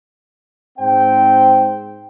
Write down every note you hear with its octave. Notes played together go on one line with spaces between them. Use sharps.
G#2 C4 C5 G5